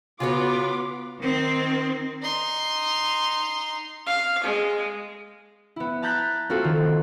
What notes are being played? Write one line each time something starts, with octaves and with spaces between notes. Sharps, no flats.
C#3 B3 F4 F#4 C#5 D6
D#3 C4
D#4 C6
F5
G#3
B3 E4
A5 A#5 F#6 G6 A6 B6
A#3 C4 F4 F#4 A4
D#3